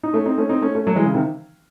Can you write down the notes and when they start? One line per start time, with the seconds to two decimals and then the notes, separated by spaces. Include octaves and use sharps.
0.03 D#4
0.13 A3 C#4
0.26 C4 D#4
0.38 A3 C#4
0.49 C4 D#4
0.62 A3 C#4
0.75 A3 C#4
0.87 F#3 A3
0.96 E3 G#3
1.06 C#3
1.14 C3 D#3